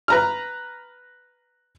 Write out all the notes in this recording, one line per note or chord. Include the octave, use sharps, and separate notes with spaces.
B4 A#5 F6